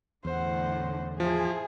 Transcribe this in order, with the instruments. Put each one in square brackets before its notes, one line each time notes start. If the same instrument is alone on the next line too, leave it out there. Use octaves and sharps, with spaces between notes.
[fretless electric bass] E2 [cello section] A2 D3 [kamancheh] C5 F#5
[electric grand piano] F3 [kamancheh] E4 C5 [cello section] G#4